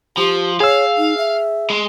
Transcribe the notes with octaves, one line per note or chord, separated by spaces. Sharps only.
F3 G4
G#4 C#5 F5 E6
D#4
E5
G#3